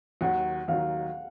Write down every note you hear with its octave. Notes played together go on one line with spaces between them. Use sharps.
D#2 D#3 F#3 F#5
D#2 D#3 F#3 F5